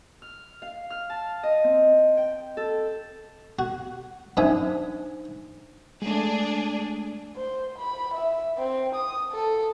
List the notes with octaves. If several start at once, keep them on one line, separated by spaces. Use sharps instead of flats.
F6
F5
F6
A5
D#5
C4
G5
A4
F#4
F#2 D4 D#4 C5 E5 D#6
G#3 A3 D4 G#4
C5
B5
E5
C4
D#6
A4